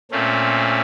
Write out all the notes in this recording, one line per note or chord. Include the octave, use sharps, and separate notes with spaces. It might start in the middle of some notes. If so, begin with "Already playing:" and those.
A#2 A3 C4 C#4